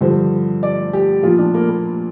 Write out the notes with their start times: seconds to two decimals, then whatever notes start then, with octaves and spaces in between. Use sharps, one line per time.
0.01 G2 D3 F3 C5
0.63 D5
0.93 G4
1.23 A#2 F3 F4
1.39 D4
1.54 A#3
1.69 A#3